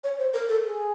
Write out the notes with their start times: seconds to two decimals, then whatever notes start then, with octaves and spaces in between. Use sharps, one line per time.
0.04 C#5
0.19 C5
0.34 A#4
0.49 A4
0.65 G#4